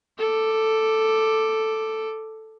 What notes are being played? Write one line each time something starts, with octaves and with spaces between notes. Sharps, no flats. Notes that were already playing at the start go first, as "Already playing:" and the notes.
A4 D6